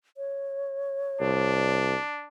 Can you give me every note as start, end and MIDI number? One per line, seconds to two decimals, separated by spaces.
0.17 1.78 73
1.21 1.94 36
1.21 2.28 62